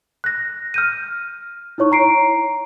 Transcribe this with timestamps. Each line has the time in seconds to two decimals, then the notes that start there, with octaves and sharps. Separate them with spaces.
0.24 F#6 A#6
0.74 F6 G6 D#7
1.78 D#4 E4 C#5 C#6
1.92 A#5 C7 D7